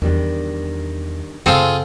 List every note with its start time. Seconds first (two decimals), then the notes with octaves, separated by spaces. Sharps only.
0.02 E2 D#3 G3 D4 D#4
1.46 F#2 C#3 C4 F4 G#4 A4